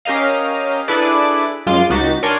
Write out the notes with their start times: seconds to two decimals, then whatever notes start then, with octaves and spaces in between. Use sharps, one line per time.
0.05 C#4 G4 A#4 D#5 F5
0.88 D4 E4 G#4 A4 B4 D5
1.66 F#2 G#3 F4 C6 D6 D#7
1.90 C#2 D#4 F#4 G4 A6 B6
2.23 D4 A#4 C#5 D5 G#5 C6